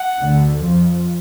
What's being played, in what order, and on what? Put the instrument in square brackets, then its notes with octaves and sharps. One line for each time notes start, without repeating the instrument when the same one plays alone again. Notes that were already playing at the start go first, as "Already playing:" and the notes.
Already playing: [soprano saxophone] F#5
[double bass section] D2 D3
F2 F3